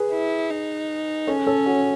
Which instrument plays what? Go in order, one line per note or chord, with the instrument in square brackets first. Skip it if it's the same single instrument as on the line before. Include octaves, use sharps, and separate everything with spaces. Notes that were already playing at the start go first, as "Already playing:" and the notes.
Already playing: [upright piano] G#4 B4
[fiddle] E4
D#4
[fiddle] C#4 [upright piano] A4 C#5
[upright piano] A4 C#5
F#4 A4